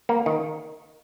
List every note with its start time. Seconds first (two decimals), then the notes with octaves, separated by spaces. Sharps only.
0.09 A#3
0.26 D#3